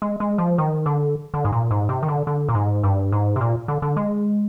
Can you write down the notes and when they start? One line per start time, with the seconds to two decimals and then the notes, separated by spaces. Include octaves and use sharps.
0.02 G#3
0.20 G#3
0.38 F3
0.58 D#3
0.86 D3
1.34 D3
1.45 G#2
1.52 A#2
1.71 G#2
1.89 C3
2.03 D#3
2.08 D3
2.27 D3
2.49 A#2
2.55 G#2
2.83 G2
3.12 G#2
3.36 C3
3.41 A#2
3.68 D3
3.82 D3
3.97 G#3